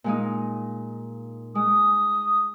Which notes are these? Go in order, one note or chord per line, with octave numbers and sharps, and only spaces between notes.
A#2 G#3 D#4
G#3 D#6